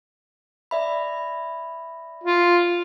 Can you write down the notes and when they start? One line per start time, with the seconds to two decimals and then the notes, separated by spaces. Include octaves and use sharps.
0.71 D5 E5 B5
2.24 F4